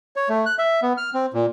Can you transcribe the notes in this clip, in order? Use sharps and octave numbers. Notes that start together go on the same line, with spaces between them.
C#5
A3
F#6
E5
B3
F6
C4
A#2